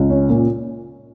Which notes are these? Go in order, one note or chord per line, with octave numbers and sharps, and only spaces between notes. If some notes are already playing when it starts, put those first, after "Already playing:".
Already playing: C#2
C#4
A#2